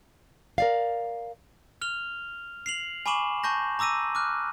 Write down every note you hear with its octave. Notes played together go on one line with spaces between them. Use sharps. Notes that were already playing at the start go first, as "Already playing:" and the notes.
A#4 D5 F5
F6 F7 G7
C7 F7 F#7
G#5 B5 C#6 D6 E7 F#7
A5 C#6 G6 A#6
A#5 D6 E6 A#6 D#7
D6 F6 F#6